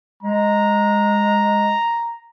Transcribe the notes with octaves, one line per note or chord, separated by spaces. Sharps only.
G#3 A#5